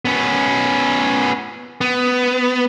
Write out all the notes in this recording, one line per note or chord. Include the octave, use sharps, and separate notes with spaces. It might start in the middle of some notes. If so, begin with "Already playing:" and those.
B3 C#4
B3